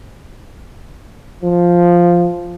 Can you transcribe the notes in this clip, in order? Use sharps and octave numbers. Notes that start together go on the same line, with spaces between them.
F3